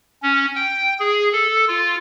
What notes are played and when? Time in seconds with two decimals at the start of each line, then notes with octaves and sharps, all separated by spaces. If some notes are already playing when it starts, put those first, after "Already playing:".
0.23 C#4
0.56 G5
1.00 G#4
1.33 A4
1.68 F4